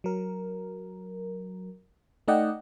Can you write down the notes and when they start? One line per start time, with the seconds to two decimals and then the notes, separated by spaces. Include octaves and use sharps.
0.04 F#3 A#4
2.28 A3 D#4 D5 D#5 F#5 G5